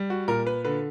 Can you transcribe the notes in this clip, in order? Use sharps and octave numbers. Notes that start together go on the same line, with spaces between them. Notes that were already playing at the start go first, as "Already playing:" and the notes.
Already playing: G3
F#4
A#2 A#4
B4
D3 B4